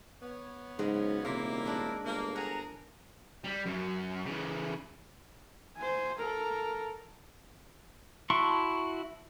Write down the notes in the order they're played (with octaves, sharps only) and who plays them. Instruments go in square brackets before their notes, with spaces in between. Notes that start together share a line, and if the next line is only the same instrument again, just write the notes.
[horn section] B3 C#5
[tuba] G#2 [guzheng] C#3 F#3 G#3
[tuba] D#1 [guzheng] C3 [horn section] A#3 E4
[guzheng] G#3 D4 D5
[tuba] G1 [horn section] A#3
[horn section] G#4 F#5 A#5 [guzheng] A#4
[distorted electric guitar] G3
F#2
C#3 E3
[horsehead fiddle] C5 G#5
A4 A#4
[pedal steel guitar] E4 F#4 A5 C6 C#6